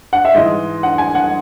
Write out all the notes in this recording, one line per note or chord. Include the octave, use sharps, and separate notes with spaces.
F#5
E5
G#2 E3 G#3 D#5
F#5
G#5
F#5